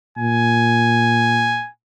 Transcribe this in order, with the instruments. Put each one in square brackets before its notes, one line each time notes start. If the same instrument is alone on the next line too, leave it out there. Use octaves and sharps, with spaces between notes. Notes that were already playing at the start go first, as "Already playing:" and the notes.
[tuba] A#2 [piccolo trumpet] G#5